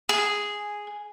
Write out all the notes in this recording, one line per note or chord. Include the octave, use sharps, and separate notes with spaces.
G#4